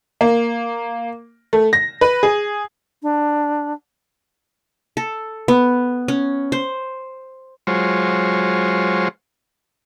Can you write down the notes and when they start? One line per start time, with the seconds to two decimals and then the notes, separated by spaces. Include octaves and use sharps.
0.21 A#3
1.53 A3
1.73 A#6
2.01 B4
2.23 G#4
3.02 D4
4.97 A4
5.48 B3
6.08 C#4
6.52 C5
7.67 F#3 G#3 F4 C5 C#5